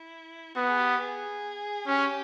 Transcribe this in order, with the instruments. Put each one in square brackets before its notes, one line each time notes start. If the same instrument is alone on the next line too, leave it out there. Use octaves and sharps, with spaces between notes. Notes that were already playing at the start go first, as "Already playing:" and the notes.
Already playing: [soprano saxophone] E4
[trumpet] B3 [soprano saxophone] F#4
[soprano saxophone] G#4
G4
G#4
[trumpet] C#4 [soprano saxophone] G4